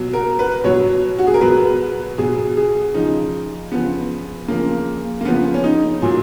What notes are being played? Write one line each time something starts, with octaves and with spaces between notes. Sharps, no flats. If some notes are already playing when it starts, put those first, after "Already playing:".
Already playing: B2 F#3
A#4
B4
B2 F#3 C#5
F#4
G#4
A#4
B2 F#3 B4
B2 F#3 G#4
G#4
C#3 F3 D#4
C#3 F3 B3
C#3 F3 A#3
A#3
C#3 F3 B3
C#4
D#4
A#2 F#3